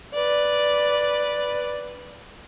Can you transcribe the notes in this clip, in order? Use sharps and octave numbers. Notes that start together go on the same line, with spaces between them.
B4 D5